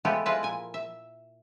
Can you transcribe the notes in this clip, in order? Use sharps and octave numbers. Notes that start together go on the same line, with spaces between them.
F3 G#3 A3 B3 G4
F3 G#3 E4 F4 B4
A#2 G#5
E5